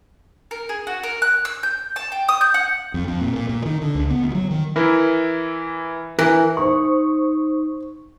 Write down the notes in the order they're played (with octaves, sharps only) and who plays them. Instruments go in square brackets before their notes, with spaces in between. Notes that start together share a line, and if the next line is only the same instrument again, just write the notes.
[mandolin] A#4
G#4
F#4
A#4
F#6
E6
G6
A5
G5
D#6
G6
F#5
[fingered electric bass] F2
F2
A#2
A#2
A#2
D#3
D3
C#2
B3
D2
F#3
D#3
[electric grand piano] E3 E4 A#4
[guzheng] E3 [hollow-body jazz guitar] A#4 [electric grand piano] F#6
[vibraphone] D#4 [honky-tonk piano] C5 C#6